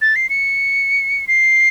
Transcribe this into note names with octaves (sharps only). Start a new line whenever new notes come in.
A6
C7
C#7
C7